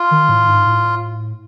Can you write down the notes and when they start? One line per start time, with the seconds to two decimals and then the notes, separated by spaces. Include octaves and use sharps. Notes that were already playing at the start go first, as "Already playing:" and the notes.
Already playing: F4
0.11 D#3
0.29 A2
0.47 G#2
0.66 A2